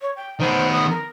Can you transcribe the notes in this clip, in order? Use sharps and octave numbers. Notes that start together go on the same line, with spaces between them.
C#5
G5
D#3 B3 C5
D#6
A#4